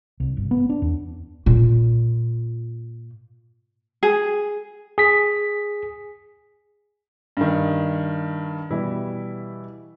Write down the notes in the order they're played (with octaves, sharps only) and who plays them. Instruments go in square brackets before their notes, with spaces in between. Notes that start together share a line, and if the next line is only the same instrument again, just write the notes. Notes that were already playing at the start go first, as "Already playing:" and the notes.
[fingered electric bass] C2
G1
B3
D4
E2
[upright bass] A#2 F4
[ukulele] G#4
[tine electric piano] G#4 B6
[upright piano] G2 D#3
B2 E3 G3 E4